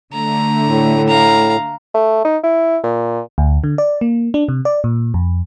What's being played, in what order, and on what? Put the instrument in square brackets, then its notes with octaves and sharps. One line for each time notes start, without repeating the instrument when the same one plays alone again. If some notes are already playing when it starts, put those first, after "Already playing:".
[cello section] D3 A3 [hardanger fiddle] A#5
[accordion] A2
[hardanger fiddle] F5 A#5
[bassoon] A3
D#4
E4
A#2
[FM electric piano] D2
D3
D5
A#3
D4
C3
D5
A#2
F2